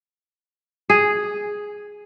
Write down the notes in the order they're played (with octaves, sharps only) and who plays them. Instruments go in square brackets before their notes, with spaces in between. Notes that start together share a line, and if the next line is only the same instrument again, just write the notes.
[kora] G#4